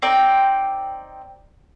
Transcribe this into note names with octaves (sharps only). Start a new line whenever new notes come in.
C4 D#4 D5 G5